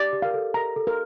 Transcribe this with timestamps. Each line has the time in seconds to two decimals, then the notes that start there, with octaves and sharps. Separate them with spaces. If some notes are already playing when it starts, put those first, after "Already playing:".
Already playing: G4 D5
0.13 G4
0.22 A#4 F5
0.34 A4
0.54 A#4 A#5
0.76 A4
0.87 A#4